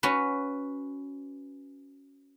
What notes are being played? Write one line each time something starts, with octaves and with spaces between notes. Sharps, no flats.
C#4 F#4 B4